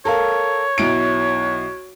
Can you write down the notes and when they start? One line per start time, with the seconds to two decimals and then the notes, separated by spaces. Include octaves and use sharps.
0.05 A4 A#4 C#5 F5
0.78 B1 E4 D7